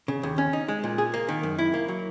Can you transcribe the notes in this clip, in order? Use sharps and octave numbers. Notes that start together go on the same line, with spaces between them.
C#3
D#2
C#4
D#4
G#3
A#2
G#4
A#3
D#3
F#2
E4
A#3
F#3